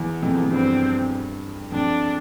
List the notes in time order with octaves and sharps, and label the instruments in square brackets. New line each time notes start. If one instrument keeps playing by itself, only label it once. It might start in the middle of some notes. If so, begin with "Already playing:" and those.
Already playing: [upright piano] E2
F2
E2
F2
[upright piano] G2 [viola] C4
[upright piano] F2 [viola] D4